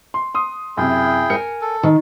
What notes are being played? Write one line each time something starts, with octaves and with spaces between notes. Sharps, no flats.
C6
C6 D#6
F#2 C3 E4 G#4 G5
A#4 G#5 C#7
A4
D#3